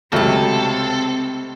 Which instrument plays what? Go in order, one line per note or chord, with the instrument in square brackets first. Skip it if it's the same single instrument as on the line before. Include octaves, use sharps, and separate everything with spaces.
[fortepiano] C#2 F#3 [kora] C3 A3 [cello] C4 [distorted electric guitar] A4